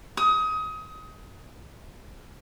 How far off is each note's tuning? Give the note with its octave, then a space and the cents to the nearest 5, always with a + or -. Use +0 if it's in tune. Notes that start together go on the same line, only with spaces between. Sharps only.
D#6 +25